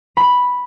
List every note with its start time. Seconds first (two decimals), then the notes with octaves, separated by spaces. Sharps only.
0.17 B5